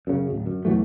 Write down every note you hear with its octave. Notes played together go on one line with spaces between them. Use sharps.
F#2 C#3
D1
F#2
E1 E3 F#3 A3